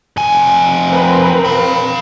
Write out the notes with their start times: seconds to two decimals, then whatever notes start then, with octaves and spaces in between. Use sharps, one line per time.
0.17 F2 G#5
0.88 C4 A#4 B4
1.45 F5 B5